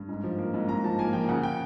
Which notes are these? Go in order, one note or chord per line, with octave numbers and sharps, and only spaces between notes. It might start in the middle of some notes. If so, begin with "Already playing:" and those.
Already playing: G2
G#2
F3
A#3
G#2
G#2 A#5
F3 A5
A#3 G#5
F3 G5
C#3 F#5
C#3 G5